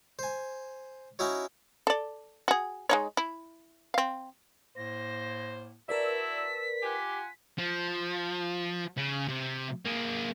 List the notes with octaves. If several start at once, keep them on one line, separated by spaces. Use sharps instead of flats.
C5 G#5
C#4 D#4 E4 F#4 C#5
A4 D5
F#4 G#4
G#3 D#4 C#5
E4
C4 F5
A2 A#3 C5 A#6
E4 F#4 A#4 B4 D5 A5 E6 B6
F4 G4 F#5 G#5
F3
C#3
C3
A#3 G#4